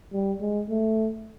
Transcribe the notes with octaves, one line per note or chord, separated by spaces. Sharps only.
G3
G#3
A3